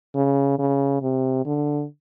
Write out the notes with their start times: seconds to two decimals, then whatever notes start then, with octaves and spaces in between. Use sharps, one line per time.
0.16 C#3
0.59 C#3
1.02 C3
1.46 D3